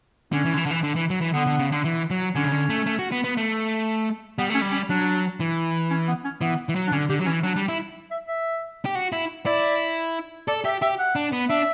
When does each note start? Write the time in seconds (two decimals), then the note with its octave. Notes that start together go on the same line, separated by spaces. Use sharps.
0.32 D3 C#4
0.45 E3
0.54 D3
0.57 E3
0.66 D3
0.71 E3
0.83 D3
0.96 E3
1.10 F#3
1.21 E3
1.34 D3 B3
1.46 D3
1.59 C#3
1.72 D3
1.84 E3
2.10 F#3
2.35 D3 C#4
2.45 C#3
2.52 D3
2.70 A3
2.86 A3
2.99 F#4
3.12 B3
3.24 B3
3.37 A3
4.39 G3 B3
4.50 A3
4.55 C#4
4.62 G3
4.72 C#4
4.89 F#3 D4
5.40 E3
5.91 C#4
6.08 B3
6.25 C#4
6.41 E3 B3
6.69 E3
6.75 F#3
6.88 D4
6.92 D3 C#4
7.10 D3 G4
7.20 F#3
7.26 E3 C#4
7.43 F#3 D4
7.56 G3
7.69 E4
8.11 E5
8.28 E5
8.85 G4
8.95 F#4
9.12 E4
9.46 E4 D5
10.48 A4 D5
10.65 G4 E5
10.82 G4 E5
10.99 F#5
11.16 D4
11.32 B3
11.49 D4 E5